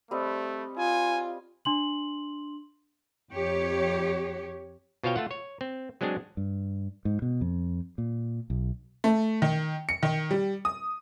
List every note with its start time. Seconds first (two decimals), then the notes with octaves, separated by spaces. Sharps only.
0.11 G3 A3 C4 D#5
0.78 F4 G#5
1.65 D4 C6 F#7
3.32 F2 G4 C#5
5.04 B2 F4 C5 C#5 F5 G5
5.16 A3 F4 F#5
5.31 C#5
5.61 C4
6.01 F#3 G#3 C4 D4 G#4
6.37 G2
7.05 G#2
7.22 B2
7.41 F2
7.98 A#2
8.50 B1
9.04 A3
9.42 D#3
9.89 C#7
10.03 D#3
10.31 G3
10.65 D#6